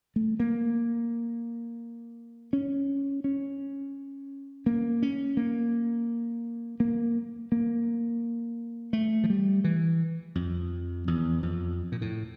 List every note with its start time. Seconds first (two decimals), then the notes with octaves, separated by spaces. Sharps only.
0.16 A3
0.40 A#3
2.53 C#4
3.24 C#4
4.66 A#3
5.02 C#4
5.37 A#3
6.80 A#3
7.52 A#3
8.93 A3
9.24 F3
9.30 G3
9.64 E3
10.35 F2
11.08 E2
11.43 F2
11.92 A#2
12.01 A2